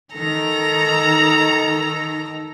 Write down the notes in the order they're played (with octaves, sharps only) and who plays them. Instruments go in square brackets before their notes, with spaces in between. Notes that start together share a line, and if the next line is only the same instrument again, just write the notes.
[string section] D#3 [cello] A4 [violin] A#5